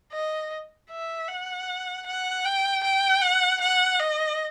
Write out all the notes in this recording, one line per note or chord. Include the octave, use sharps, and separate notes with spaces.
D#5
E5
F#5
F#5
G5
G5
F#5
F#5
D#5